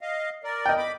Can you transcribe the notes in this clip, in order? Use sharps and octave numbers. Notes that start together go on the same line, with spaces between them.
D#5 F5
A#4 D5
D#5 G5
B5 D6